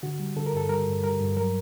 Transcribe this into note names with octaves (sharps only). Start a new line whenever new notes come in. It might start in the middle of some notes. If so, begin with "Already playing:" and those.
D3 F#4
G3
D3 A4
A#4
G2 A4
G3 A#4
G2
G3 A#4
G2
F#3 A#4